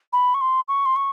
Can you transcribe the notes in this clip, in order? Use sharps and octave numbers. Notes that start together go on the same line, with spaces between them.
B5
C#6
C6
C#6
C6
C#6